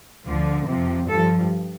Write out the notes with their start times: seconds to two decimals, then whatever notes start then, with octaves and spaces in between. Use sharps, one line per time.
0.26 D2 D3 F3
0.66 F2 C3 F3
1.08 G2 F3 A4